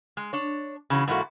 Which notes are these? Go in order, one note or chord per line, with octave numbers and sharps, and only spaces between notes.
G#3
D4 C#5
C#3 E3 F#3
G#2 E3 A3 A#3 F#4